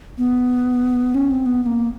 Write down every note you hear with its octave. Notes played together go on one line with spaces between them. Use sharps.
B3
C#4
C4
B3
B3
A#3